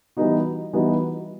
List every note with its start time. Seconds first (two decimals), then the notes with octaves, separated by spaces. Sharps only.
0.17 E3 G3 B3 D#4 F#4
0.73 E3 G3 B3 D#4 F#4